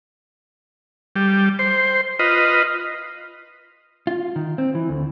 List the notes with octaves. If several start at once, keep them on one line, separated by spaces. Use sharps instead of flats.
G3
C5
F4 B4 D#5
F4
D#3
C4
E3
D2